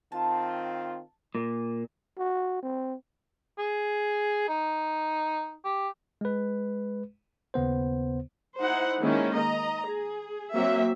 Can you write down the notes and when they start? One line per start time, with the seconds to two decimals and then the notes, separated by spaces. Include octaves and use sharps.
0.12 D#3 C4 F4 A5
1.35 A#2
2.18 F#4
2.63 C4
3.58 G#4
4.49 D#4
5.65 G4
6.21 G#3 B4
7.54 D#2 C#3 B3 C5
8.60 D#4 E4 C5 F#5
8.99 D#3 G#3 A#3 C#4 E4
9.34 D#5 A#5
9.87 G#4
10.53 F#3 A#3 C4 E5